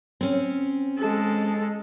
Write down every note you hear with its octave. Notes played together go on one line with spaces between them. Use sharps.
C4 C#4
G#3 A4